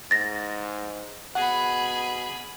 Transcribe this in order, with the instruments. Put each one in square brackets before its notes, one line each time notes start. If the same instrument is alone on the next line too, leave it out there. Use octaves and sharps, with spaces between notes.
[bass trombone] G#2 [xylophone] A6 A#6
[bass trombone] B2 [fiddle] G#4 B5 [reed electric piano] F#5